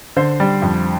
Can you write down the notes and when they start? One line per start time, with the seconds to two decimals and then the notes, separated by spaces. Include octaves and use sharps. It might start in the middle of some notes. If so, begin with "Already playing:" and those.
0.16 D3 C5
0.40 G3
0.62 F2